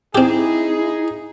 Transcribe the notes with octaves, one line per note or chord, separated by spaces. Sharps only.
C4 D#4 E4 G4 G#4